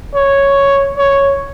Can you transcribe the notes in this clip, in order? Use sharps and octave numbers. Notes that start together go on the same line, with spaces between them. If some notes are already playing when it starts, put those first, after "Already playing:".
C#5
C#5